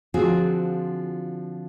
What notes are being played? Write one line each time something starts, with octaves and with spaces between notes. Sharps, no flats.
D3 F3 C4 F4 F#4 G#4